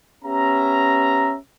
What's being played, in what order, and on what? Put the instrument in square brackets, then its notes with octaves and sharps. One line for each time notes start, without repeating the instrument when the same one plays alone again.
[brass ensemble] B3 C#4 G4 E5 A#5